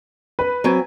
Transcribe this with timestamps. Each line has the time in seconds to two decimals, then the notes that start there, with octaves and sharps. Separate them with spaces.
0.39 B4
0.64 F#3 C4 G#5